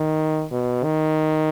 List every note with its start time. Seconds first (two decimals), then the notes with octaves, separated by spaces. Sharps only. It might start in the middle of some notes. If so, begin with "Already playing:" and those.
Already playing: D#3
0.52 B2
0.84 D#3